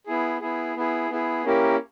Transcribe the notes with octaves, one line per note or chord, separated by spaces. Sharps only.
B3 E4 G#4
B3 E4 G#4
B3 E4 G#4
B3 E4 G#4
A#3 C#4 E4 G4 A#4